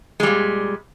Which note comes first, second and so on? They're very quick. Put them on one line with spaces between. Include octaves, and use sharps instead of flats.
G#3 G3 A#2